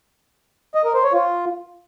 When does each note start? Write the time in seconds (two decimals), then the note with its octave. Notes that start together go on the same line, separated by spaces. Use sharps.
0.75 D#5
0.84 A#4
0.94 C5
1.04 C#5
1.13 F4